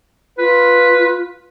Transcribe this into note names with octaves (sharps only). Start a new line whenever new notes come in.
F4 B4